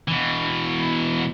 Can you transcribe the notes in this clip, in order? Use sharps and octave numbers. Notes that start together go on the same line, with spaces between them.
B2 E3